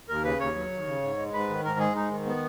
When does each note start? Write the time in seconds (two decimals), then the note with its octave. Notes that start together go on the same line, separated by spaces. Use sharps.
0.09 D#2 A#4
0.24 C#3 B4
0.40 D#2 C#5
0.55 F#3
0.71 D#2
0.87 C#3
1.02 G#2
1.17 G#3
1.33 G#2 B4
1.49 D#3
1.64 G#2 A#4
1.79 G#3 G#4
1.95 G#2 D#4
2.11 D#3
2.27 B3